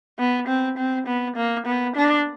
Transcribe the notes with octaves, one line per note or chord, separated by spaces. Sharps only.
B3
C4
C4
B3
A#3
B3
D4